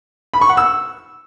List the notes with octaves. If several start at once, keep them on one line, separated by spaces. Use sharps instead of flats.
B5
C#6
F#5
E6